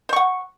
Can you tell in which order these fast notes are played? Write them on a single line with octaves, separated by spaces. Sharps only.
C5 C#6 F#5